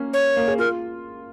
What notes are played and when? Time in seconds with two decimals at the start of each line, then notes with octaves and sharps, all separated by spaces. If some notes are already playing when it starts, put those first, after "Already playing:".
Already playing: A#3 C#4
0.13 C#5
0.37 A#3
0.48 G#4
0.59 F4 A#4